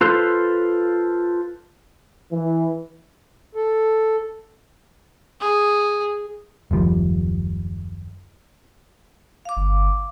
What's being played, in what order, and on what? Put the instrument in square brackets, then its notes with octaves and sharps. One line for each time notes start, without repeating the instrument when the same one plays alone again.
[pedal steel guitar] F4 A4 B4 C5 C6
[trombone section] E3
[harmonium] A4
[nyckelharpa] G#4
[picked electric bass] F#1 D#2 F3 G3
[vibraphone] F5 D6
[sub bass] G1